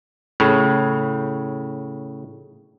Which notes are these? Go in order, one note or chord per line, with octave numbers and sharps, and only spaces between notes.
A2 C#3